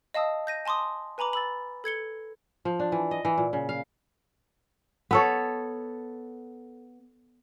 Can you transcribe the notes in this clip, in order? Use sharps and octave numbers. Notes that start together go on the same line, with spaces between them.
D#5 F5 A5 D#6 E6
G6 A#6 D#7
G#5 A5 C6 D6 D#6
B4 G#5 A#5 B5 D6
B5 E6 A6
A4 G#6 C#7 G7
F3
D4
E3
D#5
E3
A#2
C#3
F5
B3 A4 C#5